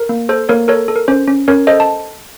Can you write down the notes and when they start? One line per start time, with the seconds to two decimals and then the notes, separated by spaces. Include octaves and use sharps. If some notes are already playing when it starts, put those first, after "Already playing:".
Already playing: A#4
0.09 A#3
0.29 A4 C5
0.49 A#3 A#4 C#5
0.68 A4 A#4 C#5
0.88 A4
0.96 A#4
1.08 C#4 C5
1.28 C#4
1.48 C#4 A#4 C#5
1.67 A4 C5 D#5
1.80 A5